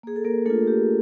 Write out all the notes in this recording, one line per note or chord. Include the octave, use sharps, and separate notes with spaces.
A#3 G#4
A4
A#3 A#4
A3 D4 F4 A4
G4